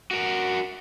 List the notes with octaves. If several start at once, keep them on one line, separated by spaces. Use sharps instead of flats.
F#4 A#4